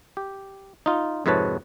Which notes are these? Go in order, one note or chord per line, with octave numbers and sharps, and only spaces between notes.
G4
D#4 F4
F2 G#2 C3 B4 C#5 A5